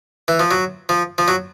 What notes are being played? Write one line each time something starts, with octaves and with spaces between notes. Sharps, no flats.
E3
F3
F#3
F3
F3
F#3